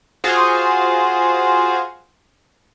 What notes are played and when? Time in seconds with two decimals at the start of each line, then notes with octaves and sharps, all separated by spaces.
0.24 F4 F#4 G#4 C5 F5